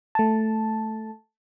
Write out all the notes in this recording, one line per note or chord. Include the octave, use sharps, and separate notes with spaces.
A3 A5